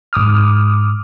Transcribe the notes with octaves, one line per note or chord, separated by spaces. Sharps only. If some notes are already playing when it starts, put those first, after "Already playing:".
G#2 D6 D#6 F6